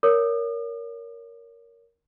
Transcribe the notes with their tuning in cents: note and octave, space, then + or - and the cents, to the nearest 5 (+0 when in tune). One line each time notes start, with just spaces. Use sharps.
A#4 +0 C#5 +25 D#6 -45